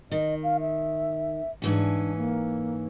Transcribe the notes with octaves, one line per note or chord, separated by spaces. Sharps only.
D#3 D#5
F5
E5
G#2 E3 C#4 D4
A#3